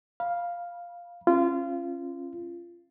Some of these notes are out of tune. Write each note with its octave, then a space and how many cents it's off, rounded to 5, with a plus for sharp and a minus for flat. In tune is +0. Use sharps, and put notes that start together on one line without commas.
F5 +0 B5 -35
C#4 -30 F4 -25